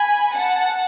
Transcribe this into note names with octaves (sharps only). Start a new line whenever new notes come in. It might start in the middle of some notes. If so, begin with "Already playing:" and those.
Already playing: G#5 B5
F#5 A5